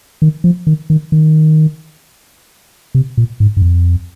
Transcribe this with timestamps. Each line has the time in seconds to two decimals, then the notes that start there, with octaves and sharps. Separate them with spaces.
0.22 D#3
0.44 F3
0.67 D#3
0.90 D#3
1.12 D#3
2.95 C3
3.17 A#2
3.40 G#2
3.57 G2
3.62 F2